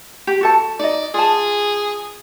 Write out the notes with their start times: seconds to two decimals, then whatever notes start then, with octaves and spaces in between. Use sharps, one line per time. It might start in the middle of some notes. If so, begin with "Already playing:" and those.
0.27 G4
0.41 F#4 A4 A5
0.79 D#4 D5 D#5
1.14 F4 G#4 A5